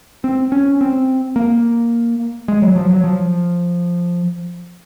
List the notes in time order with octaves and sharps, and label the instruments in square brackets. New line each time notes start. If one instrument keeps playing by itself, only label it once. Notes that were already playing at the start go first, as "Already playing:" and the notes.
[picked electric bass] C4
C#4
C4
A#3
G#3
F#3
F3
F#3
F3